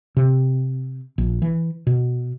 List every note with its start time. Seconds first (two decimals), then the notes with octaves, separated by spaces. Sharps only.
0.17 C3
1.18 A#1
1.42 E3
1.87 B2